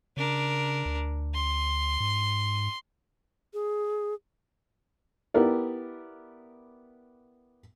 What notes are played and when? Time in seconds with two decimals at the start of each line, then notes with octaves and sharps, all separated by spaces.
0.17 C#3 D4 A#4
0.86 D2
1.35 C6
2.00 G#2
3.54 G#4
5.34 B3 E4 G4 A#4 D5